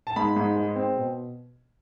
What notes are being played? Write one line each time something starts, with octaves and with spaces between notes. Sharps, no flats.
A5
G#2 B5
G#2
G#3
C4
B2